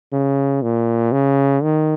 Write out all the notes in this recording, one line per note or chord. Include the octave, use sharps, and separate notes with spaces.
C#3
A#2
C#3
D#3